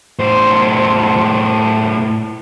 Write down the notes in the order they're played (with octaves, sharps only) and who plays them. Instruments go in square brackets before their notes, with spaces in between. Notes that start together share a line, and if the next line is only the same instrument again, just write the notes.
[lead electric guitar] A2 C5